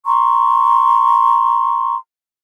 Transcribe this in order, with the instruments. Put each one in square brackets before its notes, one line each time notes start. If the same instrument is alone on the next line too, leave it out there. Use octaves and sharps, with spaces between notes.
[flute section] A#5 C6 C#6